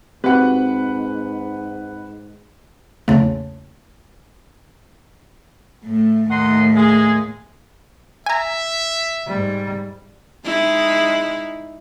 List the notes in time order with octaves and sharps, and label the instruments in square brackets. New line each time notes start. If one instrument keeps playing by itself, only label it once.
[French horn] G#2 [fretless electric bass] C4 [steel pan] F#4 G4 [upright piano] B4 F#5
[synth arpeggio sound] A#1 E2 C#3 A3
[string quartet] A2 A3
[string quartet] D#2 A2 [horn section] D#4 F#5 C6
[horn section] G#3 G#4
[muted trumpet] E5 [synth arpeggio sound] G#5 A#5
[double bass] G#2 G3
[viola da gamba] G#3 D#4 E4